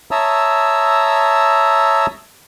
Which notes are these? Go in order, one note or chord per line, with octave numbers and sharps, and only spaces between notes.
C#5 E5 A5 A#5 D#6 E6